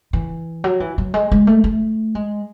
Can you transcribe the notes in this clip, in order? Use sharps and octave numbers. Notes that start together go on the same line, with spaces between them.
E3
F#3
E3
F#3
G#3
G#3
A3
A3
G#3